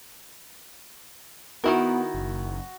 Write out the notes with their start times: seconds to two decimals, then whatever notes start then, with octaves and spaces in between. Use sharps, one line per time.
1.64 D#3 B3 E4 F#4 A#4
2.14 F#1